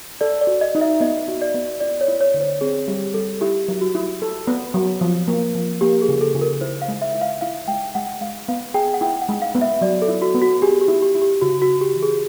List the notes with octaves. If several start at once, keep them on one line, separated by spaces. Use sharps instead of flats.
A4 D5
D5
F#4
D#5
D#4
E5
B3 D#5
F#4
D5
B3
E4 D5
C#5
E4
C#5
D3
C5
C4 G#4
G3 G4
G3 A4
E4 G4
F#3
F#4
E4
A4
B3
F#3
F3
A#3
F3
A#3 G4
G#4
C#3
A4
C#3
A#4
E4 C5
F5
G#3
E5
E4
F5
E4 F5
G#3 G5
G#3 F#5
G#3 F5
B3 F5
G#4 G5
F#5
E4 G5
F#5
G#3
F5
B3
E5
F#3 D5
A4
E4
F#4
B3
F#4
G4 G#4
G4
E4
G4
E4
G4
C#3 F#4
F#4
C#3
G4
E3
G#4